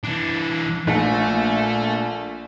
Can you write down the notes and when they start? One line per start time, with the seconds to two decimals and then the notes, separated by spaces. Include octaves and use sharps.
0.04 E3 D4
0.87 A#1 A3